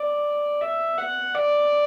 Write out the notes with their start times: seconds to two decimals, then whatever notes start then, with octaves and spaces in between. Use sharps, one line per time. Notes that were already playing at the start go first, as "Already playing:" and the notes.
Already playing: D5
0.61 E5
0.98 F#5
1.35 D5